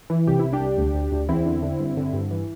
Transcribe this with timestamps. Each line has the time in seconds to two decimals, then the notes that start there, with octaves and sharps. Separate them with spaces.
0.10 E3
0.27 C2 G4
0.39 C2 E4
0.53 D4 G4
0.60 C2
0.78 D2
0.94 D2
1.12 D2
1.29 E2 C4 E4
1.45 D3
1.63 D3
1.80 G2
1.97 D3
2.13 G2
2.31 E3